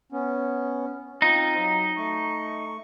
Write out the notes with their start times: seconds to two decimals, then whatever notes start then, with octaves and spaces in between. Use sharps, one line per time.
0.12 B3 C#4
1.22 C4 D#4 F4
1.57 F#3
1.97 A3 C#6